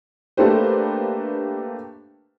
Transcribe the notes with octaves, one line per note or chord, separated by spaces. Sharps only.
A3 A#3 D4 G4 B4 C5